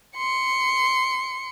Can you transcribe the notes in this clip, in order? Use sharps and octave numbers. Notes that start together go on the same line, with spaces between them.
C6 C#7